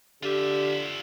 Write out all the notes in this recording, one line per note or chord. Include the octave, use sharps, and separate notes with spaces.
D3 F4 G4 E5